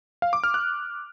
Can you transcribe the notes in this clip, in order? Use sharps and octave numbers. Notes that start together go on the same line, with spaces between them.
F5
D6
F6
F#6